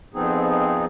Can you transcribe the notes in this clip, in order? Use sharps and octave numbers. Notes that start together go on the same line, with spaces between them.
F2 F3 B3 C4 D#4 G#4